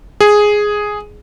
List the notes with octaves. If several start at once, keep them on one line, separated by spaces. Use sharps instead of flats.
G#4